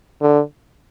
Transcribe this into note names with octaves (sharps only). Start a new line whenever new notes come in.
D3